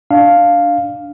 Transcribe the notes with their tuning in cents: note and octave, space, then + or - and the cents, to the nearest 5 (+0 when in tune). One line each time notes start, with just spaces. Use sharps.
D4 +0 F5 +0